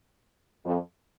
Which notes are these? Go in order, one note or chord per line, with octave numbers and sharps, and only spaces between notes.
F2